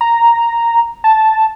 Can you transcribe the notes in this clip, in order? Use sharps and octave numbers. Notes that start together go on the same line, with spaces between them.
A#5
A5